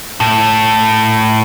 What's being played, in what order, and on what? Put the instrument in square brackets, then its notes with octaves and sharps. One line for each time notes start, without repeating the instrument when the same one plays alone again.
[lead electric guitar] A2